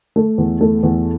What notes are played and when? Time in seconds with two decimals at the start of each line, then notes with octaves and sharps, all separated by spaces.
0.16 A3
0.38 E2
0.61 A3
0.83 E2